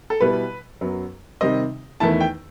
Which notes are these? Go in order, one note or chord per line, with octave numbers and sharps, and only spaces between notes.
A4
B2 G3 B3 E4 B4
F#2 F#3 B3
C3 D#3 G3 C4 D#5
E2 D#3 A3 E4 A5
G5